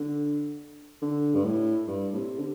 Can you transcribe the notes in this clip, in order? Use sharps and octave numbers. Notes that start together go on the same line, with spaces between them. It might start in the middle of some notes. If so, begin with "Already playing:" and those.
Already playing: D3
D3
G2
A2
G2
A2
C3
D3